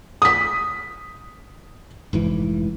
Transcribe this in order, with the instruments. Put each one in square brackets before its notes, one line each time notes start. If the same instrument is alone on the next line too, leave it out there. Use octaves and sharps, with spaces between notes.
[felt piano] D#6 B6
[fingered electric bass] F1 G#2 E3